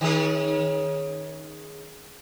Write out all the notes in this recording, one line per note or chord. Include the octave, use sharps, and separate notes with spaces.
D#3 C#4 G#4